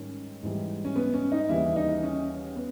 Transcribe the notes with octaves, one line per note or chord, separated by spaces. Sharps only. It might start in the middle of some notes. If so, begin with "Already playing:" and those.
Already playing: G#2 D#3 G3 C#4
G#2 E3 G3
C#4
B3
C#4
D#4
D#2 C#3 E3 G3 E4
D#4
C#4
B3